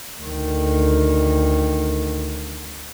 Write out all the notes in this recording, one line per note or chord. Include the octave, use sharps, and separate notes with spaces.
D2 D#3